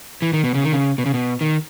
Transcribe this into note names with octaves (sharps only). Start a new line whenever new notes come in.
E3
D#3
B2
C#3
D#3
C#3
B2
C#3
B2
D#3